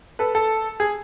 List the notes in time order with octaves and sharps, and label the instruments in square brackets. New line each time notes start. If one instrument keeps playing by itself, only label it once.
[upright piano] A4 B4
A4
G#4